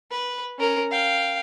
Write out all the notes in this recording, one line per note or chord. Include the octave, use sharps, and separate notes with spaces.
B4
C#4 A#4
F5 G5